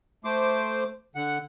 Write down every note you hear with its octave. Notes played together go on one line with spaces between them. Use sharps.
A3 C5 D6
D3 F#5